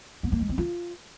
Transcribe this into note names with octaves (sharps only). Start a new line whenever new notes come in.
B3
A#3
G#3
C4
F4